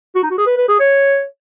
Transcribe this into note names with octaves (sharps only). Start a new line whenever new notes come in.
F#4
D#4
F#4
G#4
B4
B4
G#4
C#5